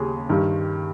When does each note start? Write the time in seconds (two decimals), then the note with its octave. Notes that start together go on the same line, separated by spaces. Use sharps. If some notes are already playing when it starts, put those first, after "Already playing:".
Already playing: D#2 C#3 G4 G#4
0.29 G2 D#3 G4